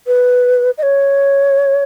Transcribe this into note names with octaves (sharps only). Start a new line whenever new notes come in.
B4
D#5
C#5